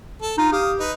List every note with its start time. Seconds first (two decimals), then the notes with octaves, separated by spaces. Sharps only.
0.22 A4
0.38 D#4 F4
0.52 G4 F5 D#6
0.80 D#4 B4